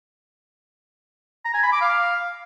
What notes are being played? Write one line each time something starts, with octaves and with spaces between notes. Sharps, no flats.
A#5
G#5
B5
D6
F5